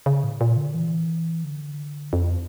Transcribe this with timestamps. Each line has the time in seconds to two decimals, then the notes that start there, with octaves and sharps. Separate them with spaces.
0.06 C#3
0.23 A2
0.41 A#2
0.57 D3
0.74 E3
1.44 D3
2.13 F2